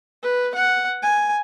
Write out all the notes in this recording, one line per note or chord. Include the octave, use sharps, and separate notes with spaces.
B4
F#5
G#5